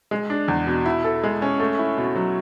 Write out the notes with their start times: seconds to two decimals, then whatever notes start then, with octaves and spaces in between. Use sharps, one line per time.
0.11 G#3
0.30 D4
0.48 E2
0.67 B2
0.86 E4
1.04 A4
1.24 G#3
1.42 C#4
1.60 A3
1.79 E4
1.97 B2
2.16 F#3